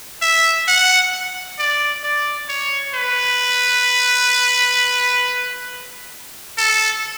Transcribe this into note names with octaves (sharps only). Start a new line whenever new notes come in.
E5
F#5
D5
D5
C#5
B4
A4